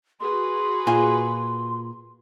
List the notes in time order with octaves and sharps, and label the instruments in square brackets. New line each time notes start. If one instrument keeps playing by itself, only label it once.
[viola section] F#4 G#4 B4 [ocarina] C6
[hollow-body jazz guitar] A#2 F4 [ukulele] G#5